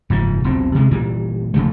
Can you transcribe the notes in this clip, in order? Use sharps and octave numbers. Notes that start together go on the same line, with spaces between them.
F#1 G#2 F3
E1 B1 A#2 C4
C3 G#3
A#2 E3 G3
E1 C#3 F3 A3